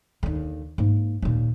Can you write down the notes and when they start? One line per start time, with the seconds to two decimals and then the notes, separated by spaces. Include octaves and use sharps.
0.23 D#2 D3
0.78 G#2 A#3
1.22 D#2 A#2